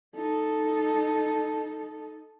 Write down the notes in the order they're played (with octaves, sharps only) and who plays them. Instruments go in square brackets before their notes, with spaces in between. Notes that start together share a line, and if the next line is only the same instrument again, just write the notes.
[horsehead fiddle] D#4 A4